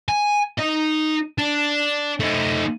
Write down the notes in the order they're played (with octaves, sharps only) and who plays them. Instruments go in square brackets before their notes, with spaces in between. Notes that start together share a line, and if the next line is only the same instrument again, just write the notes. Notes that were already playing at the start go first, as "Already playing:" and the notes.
[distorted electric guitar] G#5
D#4 D#5
D4
A3 D#4